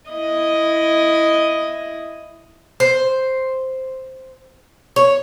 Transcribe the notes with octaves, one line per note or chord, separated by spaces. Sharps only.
E4 D#5
C5
C#5